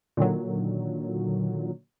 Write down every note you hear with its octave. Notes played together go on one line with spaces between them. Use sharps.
A#2 D3 D#3 F#3